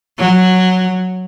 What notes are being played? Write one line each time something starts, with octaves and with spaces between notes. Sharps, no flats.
F#3